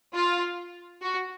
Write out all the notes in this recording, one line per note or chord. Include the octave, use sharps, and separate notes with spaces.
F4
F#4